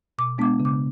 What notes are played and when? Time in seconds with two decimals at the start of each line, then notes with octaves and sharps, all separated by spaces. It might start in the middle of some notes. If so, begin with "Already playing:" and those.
0.18 B2 D6
0.38 G#3 B3 D4 D6
0.60 C#3
0.65 D6